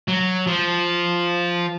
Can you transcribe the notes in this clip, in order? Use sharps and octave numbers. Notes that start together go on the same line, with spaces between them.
F#3
F3